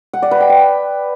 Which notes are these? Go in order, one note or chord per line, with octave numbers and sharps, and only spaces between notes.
F#5
D5
B4
G5
E5